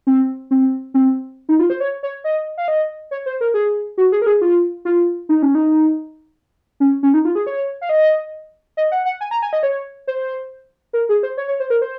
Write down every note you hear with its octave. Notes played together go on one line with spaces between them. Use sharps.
C4
C4
C4
D#4
F4
C5
C#5
C#5
D#5
F5
D#5
C#5
C5
A#4
G#4
F#4
G#4
A#4
G#4
F4
F4
D#4
C#4
D#4
C#4
C#4
D#4
F4
G#4
C#5
F5
D#5
D#5
F#5
F#5
G#5
A#5
G#5
D#5
C#5
C5
A#4
G#4
C5
C#5
C#5
C5
A#4
C5